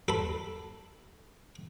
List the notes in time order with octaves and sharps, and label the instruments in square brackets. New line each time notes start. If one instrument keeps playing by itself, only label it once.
[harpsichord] A4 B5